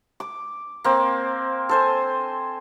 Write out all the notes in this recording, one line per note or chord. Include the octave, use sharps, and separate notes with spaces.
D6
A#3 C4
A4 C5 G#5